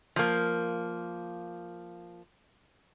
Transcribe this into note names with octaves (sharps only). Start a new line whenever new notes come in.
F3 A#3